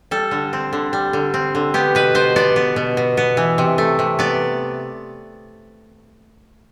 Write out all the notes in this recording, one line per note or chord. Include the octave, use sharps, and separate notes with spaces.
G3 A4
D3
C4
D3
G3
D3
C4
D3
B3 G4
B2 B4
B2 C5
B3 D5
B3
B2
B2
B3
E3
C3
A3
C3
B3 D5